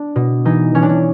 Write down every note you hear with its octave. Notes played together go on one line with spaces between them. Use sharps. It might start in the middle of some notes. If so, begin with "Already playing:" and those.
Already playing: D4
B2
E3 D#4
E3 C#4
D4
C#4